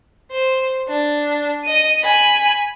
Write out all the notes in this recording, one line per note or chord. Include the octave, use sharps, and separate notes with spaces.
C5
D4
D#5 D#7
G#5 B5